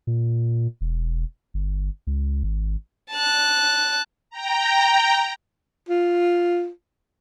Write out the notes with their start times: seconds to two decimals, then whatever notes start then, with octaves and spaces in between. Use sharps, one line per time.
0.07 A#2
0.81 E1
1.54 G1
2.07 C#2
2.43 G#1
3.12 A5 F#6
4.30 G5 A#5
5.89 F4